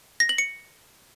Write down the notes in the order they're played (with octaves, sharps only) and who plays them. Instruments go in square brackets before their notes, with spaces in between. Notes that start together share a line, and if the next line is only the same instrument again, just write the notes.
[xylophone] A#6
F#7
C#7